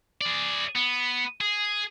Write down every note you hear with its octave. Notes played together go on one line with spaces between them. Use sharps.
G#4 D5
B3
G#4